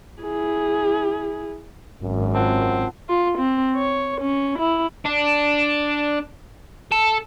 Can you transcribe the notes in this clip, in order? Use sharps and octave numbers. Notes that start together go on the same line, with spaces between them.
E4 G#4
G#1 F#2
C4 F4 F#5 A5
F4
C4
C#5
C#4
E4
D4
A4